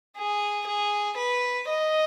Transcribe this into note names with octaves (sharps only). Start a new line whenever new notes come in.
G#4
G#4
B4
D#5